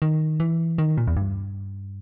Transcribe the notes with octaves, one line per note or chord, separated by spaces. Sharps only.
D#3
E3
D#3
A#2
E2
G2